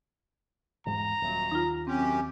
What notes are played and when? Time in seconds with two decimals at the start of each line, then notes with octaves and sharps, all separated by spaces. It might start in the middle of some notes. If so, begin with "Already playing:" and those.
0.86 E1 G#2 G#3 A#5
1.22 D#1 F#3
1.51 D#2 D#4 F4
1.87 F#2 C4 C#4 G4